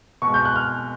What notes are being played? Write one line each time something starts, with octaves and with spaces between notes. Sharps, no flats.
B2 G#3 C#6
G6
F#6
F6